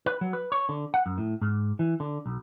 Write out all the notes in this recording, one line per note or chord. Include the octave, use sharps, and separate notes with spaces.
B4
F#3
B4
C#5
D3
F#5
F#2
A2
G#2
E3
D3
B1